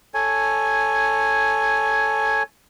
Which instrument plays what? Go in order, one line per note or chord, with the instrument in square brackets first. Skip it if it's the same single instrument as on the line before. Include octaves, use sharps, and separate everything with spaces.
[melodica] A4 C#5 G#5